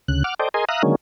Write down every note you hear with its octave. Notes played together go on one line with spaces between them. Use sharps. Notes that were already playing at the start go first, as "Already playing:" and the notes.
D2 C#3 F#6
F#5 D6 F6
A4 C5 D5 D#5 G5
G#4 A#4 D#5 G#5 C6
E5 F5 A#5 D#6 F#6
D3 D#3 F#3 G#3 A#3 C#4